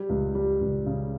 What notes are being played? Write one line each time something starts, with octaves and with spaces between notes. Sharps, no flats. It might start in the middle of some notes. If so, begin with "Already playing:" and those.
Already playing: G3
C#2
G3
C#2
C#3